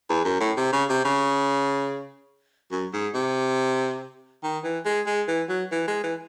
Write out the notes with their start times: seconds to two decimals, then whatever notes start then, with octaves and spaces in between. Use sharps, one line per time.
0.09 E2
0.25 F#2
0.40 A2
0.57 C3
0.73 C#3
0.89 C3
1.05 C#3
2.71 F#2
2.93 G#2
3.14 C3
4.43 D#3
4.64 E3
4.86 G#3
5.06 G#3
5.28 E3
5.49 F#3
5.72 E3
5.88 G#3
6.03 E3